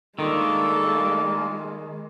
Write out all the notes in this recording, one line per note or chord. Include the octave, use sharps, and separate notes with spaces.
D#3 G3 G#3 A#3 D4 E4 F4 A4